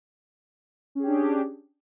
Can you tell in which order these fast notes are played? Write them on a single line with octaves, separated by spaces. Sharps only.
C#4 G#4 G4 D4